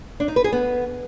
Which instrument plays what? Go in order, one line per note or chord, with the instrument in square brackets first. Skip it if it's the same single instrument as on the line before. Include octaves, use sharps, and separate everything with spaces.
[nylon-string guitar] D4
D#4
B4
G#4
B3